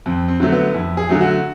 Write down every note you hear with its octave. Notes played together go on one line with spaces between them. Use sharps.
F2 C4
C4
D3 F#3 A3
B3
F2 E4
G#4
D3 F#3 A3
F#4